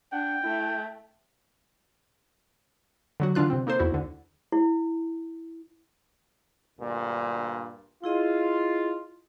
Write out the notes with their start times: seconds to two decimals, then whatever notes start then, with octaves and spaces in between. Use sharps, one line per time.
0.12 D4 F#5 G5
0.43 A3 E4
3.20 D3 F#3 F#4
3.35 D3 E3 D4 F4 F#6
3.50 C3 C4
3.67 A#3 D#4 A4 C5
3.79 E2 E4 F#4
3.91 D2 D3
4.52 E4
6.79 D2 G2 A#2
8.04 E4 F4 G#4 D#5